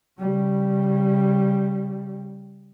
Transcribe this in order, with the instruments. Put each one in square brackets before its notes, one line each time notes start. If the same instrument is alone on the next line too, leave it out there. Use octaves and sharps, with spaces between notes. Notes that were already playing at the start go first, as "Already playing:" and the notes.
[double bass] C#3 G3